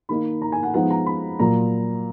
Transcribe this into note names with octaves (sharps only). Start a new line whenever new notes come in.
D#3 A#3 D#4 B5
A#5
G#5
F#5
F3 G#3 B3 D#4 F#5
A#5
B5
A#2 F#3 A#3 F4 A#5